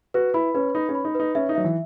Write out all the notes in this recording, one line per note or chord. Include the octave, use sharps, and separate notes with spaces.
F#4 B4
E4 B5
C#4 B4
D#4 B5
C#4
B5
D#4
D#4 B4
C#4 E5
D#4
F#3 E5
E3